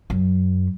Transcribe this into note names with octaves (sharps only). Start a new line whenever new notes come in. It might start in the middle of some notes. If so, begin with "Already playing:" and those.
F#2